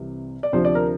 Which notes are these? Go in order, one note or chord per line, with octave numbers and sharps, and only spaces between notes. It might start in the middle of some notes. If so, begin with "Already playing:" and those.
Already playing: C2 C3 E3
D5
D2 C3 F3 C5
D5
A#4